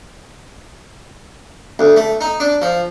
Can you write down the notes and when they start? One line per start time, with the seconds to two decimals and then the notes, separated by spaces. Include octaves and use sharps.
1.79 D2
1.96 A3
2.21 D#4
2.40 D4
2.62 F3